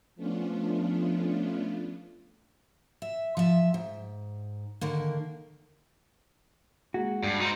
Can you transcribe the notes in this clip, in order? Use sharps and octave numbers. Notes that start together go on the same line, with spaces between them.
F3 A3 B3 C#4 D4 F4
E5
F3 E5
G#2
D3 D#3 A#3
G#3 A#3 F#4 G#4
G2
D#4 C5